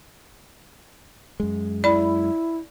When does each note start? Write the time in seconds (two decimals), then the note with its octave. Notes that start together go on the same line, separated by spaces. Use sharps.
1.40 F#2 G#3
1.84 E4 D5 B5